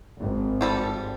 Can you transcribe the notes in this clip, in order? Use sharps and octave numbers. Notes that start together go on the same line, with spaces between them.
G#1
F3 G3 A4